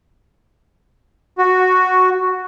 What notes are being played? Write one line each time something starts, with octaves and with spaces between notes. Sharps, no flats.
F#4